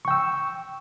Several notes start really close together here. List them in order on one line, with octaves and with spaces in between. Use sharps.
C#6 G5 E6